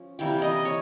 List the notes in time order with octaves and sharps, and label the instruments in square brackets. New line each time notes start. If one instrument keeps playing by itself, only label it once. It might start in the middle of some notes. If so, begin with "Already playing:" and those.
Already playing: [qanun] F3 C#4
C3 E3 G3 A#3 G5
D#5
C#5